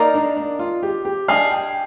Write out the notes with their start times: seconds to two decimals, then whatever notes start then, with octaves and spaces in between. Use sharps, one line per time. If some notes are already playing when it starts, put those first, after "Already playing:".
Already playing: A#3 D#4 A#4 D5
0.14 D4
0.36 D4
0.59 F4
0.83 G4
1.05 G4
1.28 D4 G#4 D#5 F5
1.51 G5